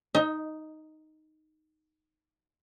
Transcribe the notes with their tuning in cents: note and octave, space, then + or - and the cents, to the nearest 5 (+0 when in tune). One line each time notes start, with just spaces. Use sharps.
D#4 +0 D#5 +35